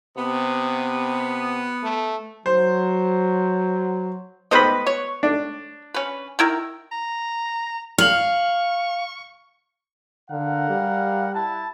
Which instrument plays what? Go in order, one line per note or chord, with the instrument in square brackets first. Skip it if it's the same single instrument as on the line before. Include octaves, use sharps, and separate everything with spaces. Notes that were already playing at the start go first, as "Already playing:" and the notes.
[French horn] C3 [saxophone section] B3
[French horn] A3
[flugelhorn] F#3 [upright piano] C5
[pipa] G3 C5 D#5 [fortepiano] B3 B4 B5
[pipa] C#5
[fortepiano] D4
[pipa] C#4 B4
D#3 E4 A#4
[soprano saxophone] A#5
[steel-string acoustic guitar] F5 [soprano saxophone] C#6 [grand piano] F6 F#7
[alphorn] D3 [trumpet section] A#4 F5 F#5
[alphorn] G3
[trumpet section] E4 A5